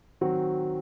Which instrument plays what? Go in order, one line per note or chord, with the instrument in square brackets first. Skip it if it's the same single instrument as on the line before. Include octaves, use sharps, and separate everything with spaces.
[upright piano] D#3 F#3 C4 [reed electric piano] F#4